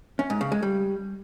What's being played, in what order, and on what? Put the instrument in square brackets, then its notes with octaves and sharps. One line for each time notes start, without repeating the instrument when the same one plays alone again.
[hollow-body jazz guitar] C#4
G#2
C#3
G#3
G3